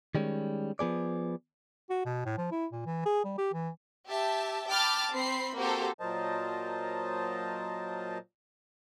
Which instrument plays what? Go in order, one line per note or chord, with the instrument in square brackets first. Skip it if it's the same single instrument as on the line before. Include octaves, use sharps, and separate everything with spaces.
[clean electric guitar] D#3 G3 G#3 C#4
F3 B3 G#4 D5
[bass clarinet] F#4
B2
A2
F3
E4
A#2
E3
G#4
G3
G4
E3
[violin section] G4 E5 A5
G5 A5 B5 D6 F6 A6
C4 B5 C7
A#3 C4 F#4 G4 A4 C5
[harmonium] A#2 F#3 A#4 C5 D#5 A5